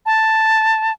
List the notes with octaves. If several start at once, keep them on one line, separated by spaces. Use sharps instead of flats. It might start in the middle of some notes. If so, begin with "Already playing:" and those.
A5